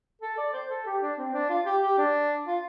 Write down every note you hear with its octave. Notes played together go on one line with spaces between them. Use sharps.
A4
D5
C5
A4
G4
D4
C4
D4
F4
G4
G4
D4
F4